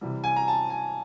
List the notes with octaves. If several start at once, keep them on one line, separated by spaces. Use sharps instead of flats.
C3 E3 G3
G#5
A#5
A5
G#5